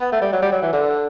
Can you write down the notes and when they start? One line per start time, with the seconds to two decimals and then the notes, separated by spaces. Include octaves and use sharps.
0.01 B3
0.12 A3
0.22 G3
0.33 F#3
0.42 G3
0.52 F#3
0.63 E3
0.73 D3